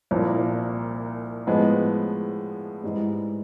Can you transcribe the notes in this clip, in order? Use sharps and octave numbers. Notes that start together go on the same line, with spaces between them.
C2 A#2 F3 A#3
A2 F3 G#3 B3
G#2 E3 G3